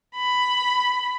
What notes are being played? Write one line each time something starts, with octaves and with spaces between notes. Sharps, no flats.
B5